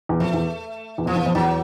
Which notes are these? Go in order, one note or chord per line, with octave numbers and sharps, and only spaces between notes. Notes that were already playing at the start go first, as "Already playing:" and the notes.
E2
F2 A3
E2
E2
F2 F3
E2
F2
E2 F#3